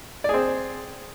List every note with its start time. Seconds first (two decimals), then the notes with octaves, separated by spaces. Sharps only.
0.24 D5
0.29 G#4
0.34 C4